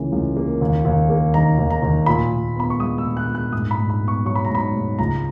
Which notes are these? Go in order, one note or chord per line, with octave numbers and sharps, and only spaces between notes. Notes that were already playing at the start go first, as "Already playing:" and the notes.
Already playing: C#2 C#3 E3 A#3
C#2
A#3
D#2
D#2
A#3
D#3 A#5
D#2
A#5
D#2
A#2 B5
A#2
B3 B5
C#6
G#3 D#6
E6
A#2
F#6
A#2
F#6
G#2 D#6
B5
G#2
B5
B3
C#6
F#3 C#6
B5
A#5
G#2 B5
G#2
C#2 A#5